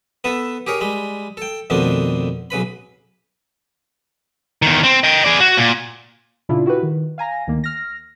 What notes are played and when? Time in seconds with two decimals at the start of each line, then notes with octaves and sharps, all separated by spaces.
0.24 B3 A4 B4 E5
0.67 G4 G#4 A#4 C#5
0.81 G3 G#3 B5
1.37 A4 G5
1.70 F2 B2 D#3 A3 C4 D4
2.50 B1 C#3 B4 B5
4.62 E2 D#3
4.84 C4
5.04 D#5 G5
5.25 G#4 D5
5.40 F#4
5.57 A#2
6.49 A#2 C#3 D4 E4 F4
6.66 E4 F#4 G4 B4
6.83 D#3
7.18 F5 G#5 A#5 A#6
7.47 D2 D#3 A#3
7.64 F6 A#6